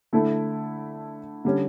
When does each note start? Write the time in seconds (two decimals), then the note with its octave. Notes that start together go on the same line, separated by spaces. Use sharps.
0.13 D3 A3 E4 A4
1.45 D3 G3 C#4